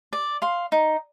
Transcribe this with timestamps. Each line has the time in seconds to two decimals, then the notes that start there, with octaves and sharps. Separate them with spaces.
0.13 D5
0.42 F5 C6
0.72 D#4